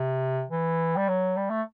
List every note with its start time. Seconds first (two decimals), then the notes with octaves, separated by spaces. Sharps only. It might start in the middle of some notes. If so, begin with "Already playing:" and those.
Already playing: C3
0.50 E3
0.96 G3
1.08 F#3
1.37 G3
1.50 A3